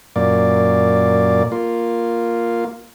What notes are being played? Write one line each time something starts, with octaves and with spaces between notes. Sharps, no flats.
F#2 A#2 A#3 D5
A#3 F4